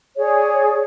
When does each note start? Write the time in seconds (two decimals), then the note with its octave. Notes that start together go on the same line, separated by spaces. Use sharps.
0.17 G#4 C#5 D5